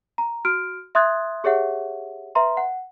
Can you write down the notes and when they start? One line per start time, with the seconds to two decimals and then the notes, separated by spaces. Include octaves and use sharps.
0.18 A#5
0.45 F#4 F6 D7
0.95 E5 C6 D#6 F#6 G#6 A6
1.44 G4 G#4 C#5 E5 F#5
2.35 B4 E5 A#5 C6
2.57 F#5